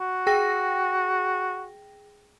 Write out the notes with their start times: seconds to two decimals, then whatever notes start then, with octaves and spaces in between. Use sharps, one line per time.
0.01 F#4
0.27 G#4 G5 A#6